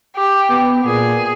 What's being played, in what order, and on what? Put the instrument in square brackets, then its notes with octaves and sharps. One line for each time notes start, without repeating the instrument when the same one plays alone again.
[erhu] G4
[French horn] B3
[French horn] A#2 [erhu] G#4